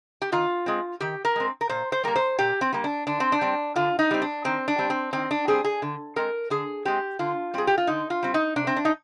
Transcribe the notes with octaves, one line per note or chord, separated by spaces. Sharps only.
G4
D#3 F4
G#3 C4
D#3 G4
A#4
G#3 C4
A#4
A#2 C5
C5
G3 A#3 A#4
C5
A#2 G4
C4
G3 A#3
D4
D3 D4
C4
D4
G3 C4
D3 F4
D#4
G3 C4
D4
D#3 C4
D4
G3 C4
C4
D#3 C4
D4
G3 C4 G#4
G#4
D3
G#3 C4 A#4
D3 G#4
G#3 C4 G4
D3 F4
G3 C4 G#4
G4
F4
D3 D#4
F4
G3 C4
D#4
C3 D4
C4
D4
D#4